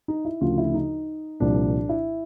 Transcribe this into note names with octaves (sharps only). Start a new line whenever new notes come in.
D#4
E4
D2 C#3 F3 F4
E4
D#4
C2 A#2 F3 D4
E4